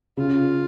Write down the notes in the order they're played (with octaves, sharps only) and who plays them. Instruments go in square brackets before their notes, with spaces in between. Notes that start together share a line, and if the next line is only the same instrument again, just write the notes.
[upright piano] C#3 [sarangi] F4